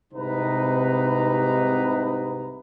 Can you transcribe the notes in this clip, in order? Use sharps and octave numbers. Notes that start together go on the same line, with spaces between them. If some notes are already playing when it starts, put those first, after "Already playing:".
C2 G#2 C3 D#4 B4 A#5